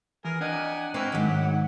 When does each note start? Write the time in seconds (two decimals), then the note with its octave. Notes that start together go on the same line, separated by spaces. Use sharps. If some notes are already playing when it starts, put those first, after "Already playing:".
0.25 E3 G#4 A#4
0.41 D4 G4 D#5 F#5 G#5
0.94 E3 A#3 C4 F#4
1.12 G#2 D#3 F#3 G4 F#5